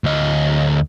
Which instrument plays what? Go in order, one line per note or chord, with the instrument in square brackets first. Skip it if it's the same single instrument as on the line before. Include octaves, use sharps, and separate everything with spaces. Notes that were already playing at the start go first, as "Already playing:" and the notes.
[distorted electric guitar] D2 D#5